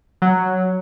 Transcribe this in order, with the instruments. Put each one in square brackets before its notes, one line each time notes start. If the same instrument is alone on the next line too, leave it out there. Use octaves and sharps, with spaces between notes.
[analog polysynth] F#3